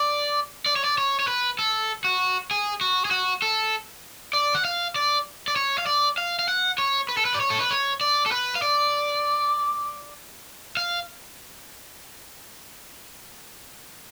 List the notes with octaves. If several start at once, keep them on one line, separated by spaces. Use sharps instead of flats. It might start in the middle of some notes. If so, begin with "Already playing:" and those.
Already playing: D5
D5
C#5
D5
C#5
C#5
B4
A4
F#4
G#4
F#4
G#4
F#4
A4
D5
F#5
F5
D5
D5
C#5
F5
D5
F5
F5
F#5
C#5
B4
A4
B4
D5
C#5
A4
B4
C#5
D5
A4
B4
F5
D5
F5